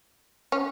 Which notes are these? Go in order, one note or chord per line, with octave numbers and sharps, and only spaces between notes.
C#4